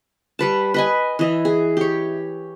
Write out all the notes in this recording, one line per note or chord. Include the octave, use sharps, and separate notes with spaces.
G3 B4 A5
B4 D#5 G#5
E3 D#5 E5
G#4
G4 C#5